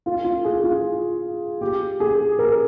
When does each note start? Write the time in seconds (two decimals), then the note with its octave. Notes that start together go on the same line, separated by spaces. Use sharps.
0.06 F4
0.24 F4
0.44 G#4
0.64 F4
1.61 G4
2.00 G#4
2.39 A#4